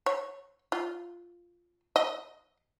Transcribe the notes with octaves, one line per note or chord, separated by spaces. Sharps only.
C#5
F4
D#5